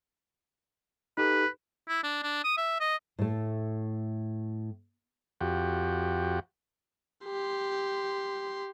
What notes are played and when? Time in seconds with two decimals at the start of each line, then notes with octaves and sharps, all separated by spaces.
1.18 D#4 G4 A4 B4
1.88 E4
2.04 D4
2.23 D4
2.44 D#6
2.57 E5
2.80 D#5
3.19 A2 A3
5.41 F2 F#4 G4
7.24 G4 C6